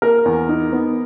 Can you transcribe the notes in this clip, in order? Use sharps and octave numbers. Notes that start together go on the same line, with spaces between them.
A#3 A#4
E2
D#4
B3